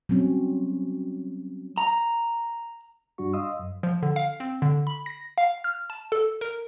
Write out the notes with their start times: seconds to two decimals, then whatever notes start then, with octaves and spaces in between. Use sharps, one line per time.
0.09 F#3 G3 C4 C#4
1.78 A#5
3.18 G2 G3 D4 F#4 C#6
3.33 D#5 F5 C6 D#6 E6
3.59 F#2
3.83 F3
4.03 D3
4.16 F5
4.40 C4
4.62 D3
4.87 B5
5.06 A#6
5.38 F5
5.64 F6
5.90 A5
6.12 A4
6.41 A#4